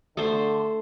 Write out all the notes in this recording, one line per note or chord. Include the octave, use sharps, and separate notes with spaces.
D3 A3 C5